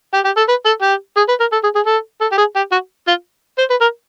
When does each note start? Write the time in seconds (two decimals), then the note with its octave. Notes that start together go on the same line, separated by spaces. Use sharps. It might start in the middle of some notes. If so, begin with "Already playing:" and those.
0.14 G4
0.25 G4
0.37 A4
0.49 B4
0.66 A4
0.82 G4
1.17 G#4
1.28 B4
1.40 A#4
1.52 A4
1.63 G#4
1.75 G#4
1.86 A4
2.21 A4
2.32 G4
2.37 G#4
2.56 G4
2.72 F#4
3.07 F4
3.58 C5
3.70 B4
3.81 A#4